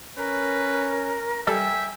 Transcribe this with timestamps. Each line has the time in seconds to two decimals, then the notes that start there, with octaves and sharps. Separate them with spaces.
0.18 C#4 A#4 B4
1.47 G3 A4 D5 E5 G5 G#5